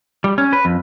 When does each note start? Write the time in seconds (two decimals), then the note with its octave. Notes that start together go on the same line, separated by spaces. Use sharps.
0.24 G3
0.38 C#4
0.53 B4
0.65 F2